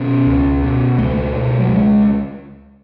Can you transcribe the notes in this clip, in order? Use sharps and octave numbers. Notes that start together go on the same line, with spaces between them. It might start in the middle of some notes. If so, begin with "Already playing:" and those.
Already playing: B2 C#4
C#2
B2
C#2 A3
B2
F#3
C#2 G#3